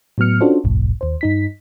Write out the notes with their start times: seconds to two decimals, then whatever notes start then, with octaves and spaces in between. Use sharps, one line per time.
0.18 A2 F#3 B3 F6 C#7
0.41 C#4 D4 F4 F#4 A4 C5
0.64 G1 C2 F2 A2
1.01 D#2 C5
1.21 G2 D#4 B6